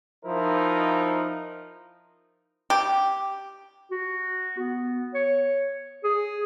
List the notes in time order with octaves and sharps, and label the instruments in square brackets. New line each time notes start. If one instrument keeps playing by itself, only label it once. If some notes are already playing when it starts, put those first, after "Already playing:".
[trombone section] F3 D#4 E4 A#4 C5
[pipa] G4
[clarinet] F#4
B3
C#5
G#4